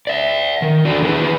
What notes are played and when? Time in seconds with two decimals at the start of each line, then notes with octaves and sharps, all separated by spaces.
0.07 D5 E5
0.62 D#3
0.85 D3 F#4 D5
1.02 D#3 E3 G#4 B4